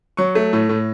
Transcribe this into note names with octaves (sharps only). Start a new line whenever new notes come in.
F#3 C#6
A3
A2
A2